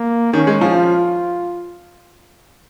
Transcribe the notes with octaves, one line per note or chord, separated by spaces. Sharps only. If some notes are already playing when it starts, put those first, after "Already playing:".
Already playing: A#3
D#3 C#4
G#3
F3
F4